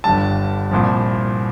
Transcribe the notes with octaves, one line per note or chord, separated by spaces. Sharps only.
G1 G2 D3 G3 A5
C2 A#2 F3